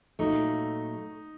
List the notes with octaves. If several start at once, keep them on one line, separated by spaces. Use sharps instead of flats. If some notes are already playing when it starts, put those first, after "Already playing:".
A#2 F#3 A3 D#4